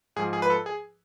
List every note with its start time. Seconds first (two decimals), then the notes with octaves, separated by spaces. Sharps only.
0.16 G#2 F3 G#4
0.33 G#4
0.42 B4
0.50 A4
0.66 G#4